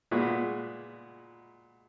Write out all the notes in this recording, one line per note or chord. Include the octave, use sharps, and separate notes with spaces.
A#2 G#3 B3 F#4